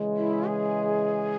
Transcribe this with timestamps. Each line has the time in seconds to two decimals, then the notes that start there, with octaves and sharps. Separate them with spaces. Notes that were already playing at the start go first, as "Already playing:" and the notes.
Already playing: C#3 E3 G#3
0.16 E4
0.48 G#4